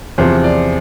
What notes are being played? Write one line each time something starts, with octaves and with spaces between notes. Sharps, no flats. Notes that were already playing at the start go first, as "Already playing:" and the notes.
E2 C3 F3 C5
D5